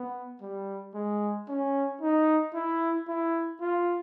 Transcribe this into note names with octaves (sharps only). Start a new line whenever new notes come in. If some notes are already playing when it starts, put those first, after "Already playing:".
Already playing: B3
G3
G#3
C#4
D#4
E4
E4
F4